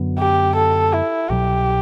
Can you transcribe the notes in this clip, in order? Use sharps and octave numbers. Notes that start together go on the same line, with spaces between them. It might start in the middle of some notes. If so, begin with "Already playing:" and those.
Already playing: F#2 D3 F#3 B3
G4
A4
E4
C2 B2 F#3 G4